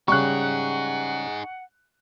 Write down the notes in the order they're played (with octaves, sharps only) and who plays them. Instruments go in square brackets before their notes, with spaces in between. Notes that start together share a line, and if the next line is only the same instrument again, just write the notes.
[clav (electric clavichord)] C#3 G3 [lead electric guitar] D#4 G#4 [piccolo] F#5 [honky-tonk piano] C#6 F#6